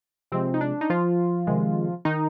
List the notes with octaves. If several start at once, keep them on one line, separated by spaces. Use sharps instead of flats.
C3 F3 G#3 C4
D#4
D4
D#4
F3 F4
C3 D#3 G#3
D#3 D#4